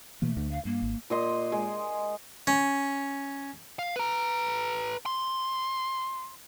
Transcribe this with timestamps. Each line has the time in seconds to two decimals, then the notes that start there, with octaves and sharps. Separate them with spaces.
0.22 B2 E3 A3 A#3
0.37 D2 D3
0.51 F5
0.65 G2 A#3
0.82 G#1
1.10 A#2 D#5 C6
1.52 G#3
2.47 C#4
3.79 F5
3.96 B4 A#5
5.06 C6